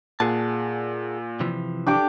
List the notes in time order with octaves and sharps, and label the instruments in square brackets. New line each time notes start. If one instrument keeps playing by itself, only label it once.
[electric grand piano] A#2 [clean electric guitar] G#4 F#5 A5
[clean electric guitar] C3 E3 F3
[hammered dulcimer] D4 G4 D6